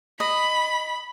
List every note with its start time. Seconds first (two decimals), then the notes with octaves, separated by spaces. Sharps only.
0.20 D#5 B5